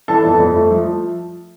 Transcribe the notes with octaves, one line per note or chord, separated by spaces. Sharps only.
E3 A4 A5
F2
F2
A3
F3